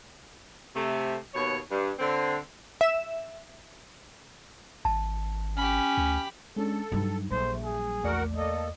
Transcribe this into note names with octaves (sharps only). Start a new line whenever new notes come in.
C3 A3
D#2 B2 C#5
G2
D3 C4
E5 E7
G#1 A5
C#4 G4 B5
D2
G#3 C#4 D4 A4
G2 F#3 G3 D#4
A#1 A3 C5
G#4
E2 A3 F#4 A#4 D5 F#5
A#3 A4 D#5